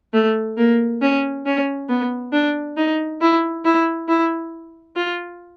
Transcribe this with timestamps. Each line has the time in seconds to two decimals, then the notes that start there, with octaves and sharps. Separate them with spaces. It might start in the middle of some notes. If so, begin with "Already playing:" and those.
0.13 A3
0.58 A#3
1.01 C#4
1.46 C#4
1.89 B3
2.32 D4
2.77 D#4
3.21 E4
3.65 E4
4.08 E4
4.96 F4